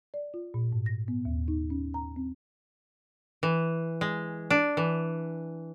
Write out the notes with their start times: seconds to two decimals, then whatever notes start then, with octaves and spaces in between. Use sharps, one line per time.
0.14 D5
0.34 F4
0.54 A#2
0.73 G#2
0.86 A#6
1.08 B3
1.25 D#2
1.48 D#4
1.70 C#4
1.94 A#5
2.16 C4
3.43 E3
4.01 G#3
4.50 D4
4.77 E3